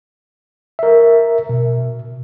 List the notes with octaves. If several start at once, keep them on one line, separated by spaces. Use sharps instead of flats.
A#4 E5
B2